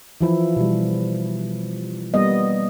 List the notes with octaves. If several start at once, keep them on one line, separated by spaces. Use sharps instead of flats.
E3 F3 E4
B2 G3
G3 A#3 B3 D#5